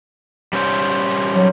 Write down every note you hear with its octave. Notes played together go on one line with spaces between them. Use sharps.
G3 C#4 C5
F#3